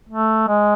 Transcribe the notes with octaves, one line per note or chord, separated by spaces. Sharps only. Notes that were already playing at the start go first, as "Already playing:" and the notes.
A3
G#3